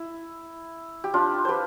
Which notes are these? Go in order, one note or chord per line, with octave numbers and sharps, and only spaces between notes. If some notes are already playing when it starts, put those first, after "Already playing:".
Already playing: E4
G4
D4 F4
G4 B4 C5